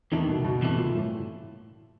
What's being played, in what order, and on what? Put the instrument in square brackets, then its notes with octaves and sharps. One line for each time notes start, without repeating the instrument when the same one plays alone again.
[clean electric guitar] E2 C3 E3 A3 D4 [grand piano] D#3
[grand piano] B2
B2
[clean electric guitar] E2 C3 E3 A3 D4
[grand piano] A#2
A2